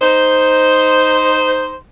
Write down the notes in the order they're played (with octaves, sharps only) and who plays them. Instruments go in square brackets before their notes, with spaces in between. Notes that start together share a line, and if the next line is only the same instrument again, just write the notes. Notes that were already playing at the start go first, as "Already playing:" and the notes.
[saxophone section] D#4 C5